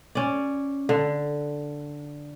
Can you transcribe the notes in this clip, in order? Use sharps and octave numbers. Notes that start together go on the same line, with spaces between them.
C#4 D5
D3